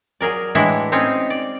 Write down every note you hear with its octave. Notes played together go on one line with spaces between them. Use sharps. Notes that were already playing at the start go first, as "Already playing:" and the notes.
F#3 G#4 A#4 D5
A2 E3 G#3 D4 E4 F#4
C4 C#4 D#4 G#4 C#5
D5